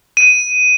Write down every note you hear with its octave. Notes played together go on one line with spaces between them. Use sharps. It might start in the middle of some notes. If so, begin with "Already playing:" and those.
D#7